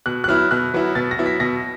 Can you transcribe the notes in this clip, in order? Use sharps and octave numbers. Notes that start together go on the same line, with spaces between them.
B2 F#6
F#6
F#3 B3 E4 F6
B2 F#6
F#3 B3 E4
B2 A6
A#6
F#3 B3 E4
B6
B2 A#6